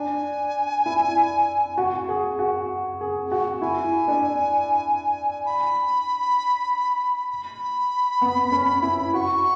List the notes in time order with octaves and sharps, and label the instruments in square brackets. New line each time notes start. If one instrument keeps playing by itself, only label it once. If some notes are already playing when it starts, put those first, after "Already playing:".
Already playing: [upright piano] D4 [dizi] G#5
[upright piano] E4
F#4
G#4
F#4
G#4
F#4
[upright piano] E4 [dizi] G#5
[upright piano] D4
[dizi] B5
B5
[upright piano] B3
C#4
E4
[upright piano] F#4 [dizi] C#6